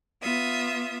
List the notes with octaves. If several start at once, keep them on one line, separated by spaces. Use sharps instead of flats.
B3 F4 E5 D#6